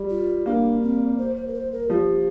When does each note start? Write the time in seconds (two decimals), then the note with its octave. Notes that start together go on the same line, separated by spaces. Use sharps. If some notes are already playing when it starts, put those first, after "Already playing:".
Already playing: G3
0.10 F4
0.46 A#3 D4
0.83 C4
1.18 C5
1.36 C5
1.47 A#4
1.54 C5
1.72 A#4
1.89 F3 G4